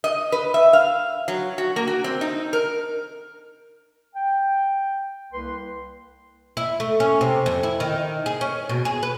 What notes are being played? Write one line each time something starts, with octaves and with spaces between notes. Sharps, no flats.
D#5
B4
E5
F5
F#3
F#4
A#3
F#4
C4
D#4
A#4
G5
C2 A#3 B4 C6
E4
A3
C#4
C3
F2
E4
D#3
G#4
C#4
B2
G#4
B4